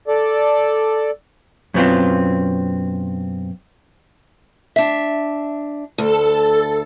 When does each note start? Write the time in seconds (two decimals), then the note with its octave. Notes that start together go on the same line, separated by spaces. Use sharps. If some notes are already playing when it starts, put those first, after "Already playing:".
0.08 A4 D5
1.74 F#2 B2 B3 C4 F4
4.76 D4 E5
5.98 D2 A4